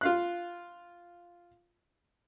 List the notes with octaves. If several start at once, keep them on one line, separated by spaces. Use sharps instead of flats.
F4 F5 F#6